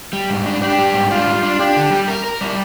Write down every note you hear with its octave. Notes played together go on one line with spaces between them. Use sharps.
G3
G#2
D4
D4 G4
G3
G#2
D4 F4
G3
D4
D4 G4
D3
G3
A#4
A#4
G3